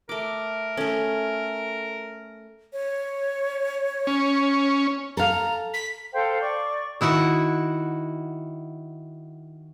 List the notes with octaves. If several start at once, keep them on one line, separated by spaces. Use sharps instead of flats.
A3 A#4 D6
A3 C#4 A4
C#5
C#4
A4 F5 A#5
B6
A4 C5 F5 G5
D5 C#6
D#3 E4 F#4 F#5